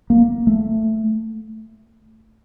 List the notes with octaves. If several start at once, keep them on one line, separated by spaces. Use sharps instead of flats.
A#3
A3